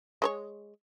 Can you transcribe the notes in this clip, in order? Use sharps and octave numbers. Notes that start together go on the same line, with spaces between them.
G#3 C5 C#5